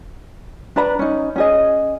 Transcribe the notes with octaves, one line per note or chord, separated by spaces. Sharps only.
D4 B4 A#5 B5
C#4 D#4
C#4 G#4 D#5